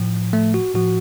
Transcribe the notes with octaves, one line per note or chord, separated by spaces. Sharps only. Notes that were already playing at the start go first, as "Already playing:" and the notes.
Already playing: A2 F3
A3
F#4
A2 F3 F#4